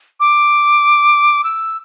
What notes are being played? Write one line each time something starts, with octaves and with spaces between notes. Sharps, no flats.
D6
E6